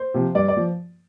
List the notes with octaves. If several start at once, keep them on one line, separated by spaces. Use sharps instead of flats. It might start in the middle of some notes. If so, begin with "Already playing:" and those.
Already playing: C5
C3 F3
G2 D5
D5
F3